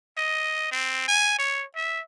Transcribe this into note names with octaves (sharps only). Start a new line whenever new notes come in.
D#5
C4
G#5
C#5
E5